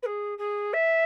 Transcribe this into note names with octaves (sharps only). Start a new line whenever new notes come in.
B4
G#4
G#4
E5